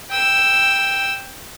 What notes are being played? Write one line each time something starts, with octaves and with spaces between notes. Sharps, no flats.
G5 E6